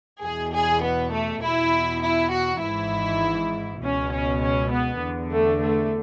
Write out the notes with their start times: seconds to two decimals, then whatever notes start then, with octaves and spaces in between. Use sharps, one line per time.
0.23 E2 B2 G#4
0.53 G#4
0.83 B3
1.13 A3
1.42 E2 B2 E4
2.03 E4
2.32 F#4
2.62 G#1 G#2 E3 E4
3.81 C#2 B2 C#4
4.12 C#4
4.41 C#4
4.71 B3
5.02 E2 D3
5.32 A3
5.61 A3